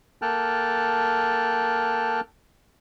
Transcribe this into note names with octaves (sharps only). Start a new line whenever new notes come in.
A#3 A4 G5 A5 F6 F#6